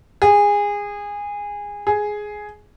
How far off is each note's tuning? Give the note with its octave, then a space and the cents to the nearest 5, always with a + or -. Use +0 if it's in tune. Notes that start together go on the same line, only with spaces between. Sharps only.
G#4 -20
G#4 +5